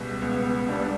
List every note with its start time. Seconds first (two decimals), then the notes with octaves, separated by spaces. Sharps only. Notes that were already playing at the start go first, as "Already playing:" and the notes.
Already playing: C#2 B2 G3
0.22 C#2 B3
0.68 B2 G3 D4